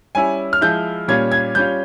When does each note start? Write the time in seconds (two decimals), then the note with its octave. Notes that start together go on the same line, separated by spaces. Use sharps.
0.15 G3 C#4 E4 G#5
0.53 F6
0.61 F3 G#3 E4 G6
1.08 A#2 G3 C#4 F4 G#6
1.32 G#6
1.55 G3 C#4 F4 G6